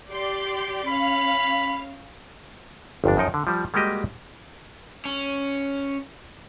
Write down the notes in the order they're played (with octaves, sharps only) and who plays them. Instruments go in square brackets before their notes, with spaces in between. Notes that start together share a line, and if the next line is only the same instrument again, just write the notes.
[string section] G4 D5 C6
[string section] C#4 F5 [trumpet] B5
[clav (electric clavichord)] G1 F2 D4
F#2 F3 D#4 G5
D3
F3 G3
G3 G#3 A#3 F#4 G4 D#5
[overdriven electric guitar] C#4